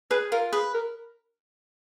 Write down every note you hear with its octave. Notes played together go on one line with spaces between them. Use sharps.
G#4 B4
F4 A#4
G#4 B4
A#4